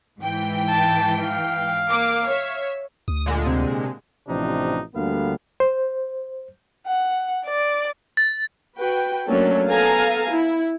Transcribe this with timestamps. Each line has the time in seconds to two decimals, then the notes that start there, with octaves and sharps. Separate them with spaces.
0.20 G#2 E3 G5
0.69 A5
1.23 F5
1.90 A#3 D6
2.27 C#5 E5
3.08 D2 D#6
3.26 A#2 D3 G#3
3.46 C3
4.29 A1 C3 E3 F3 D4 D#4
4.95 D2 D3 G3 A#3 B3 F5
5.60 C5
6.87 F#5
7.46 D5
8.17 A6
8.77 F#4 B4 G5
9.27 F#3 A3 A#3 C#4 D4 A4
9.68 B3 A4 F5 G#5 A#5
10.31 E4